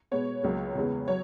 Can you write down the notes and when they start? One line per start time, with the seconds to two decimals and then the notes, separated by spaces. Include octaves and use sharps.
0.11 B2 G#3 B3 C#5
0.43 C#2 C#3 F#3 A#3
0.75 E2 C#3 G#3 B3
1.08 F#3 C#5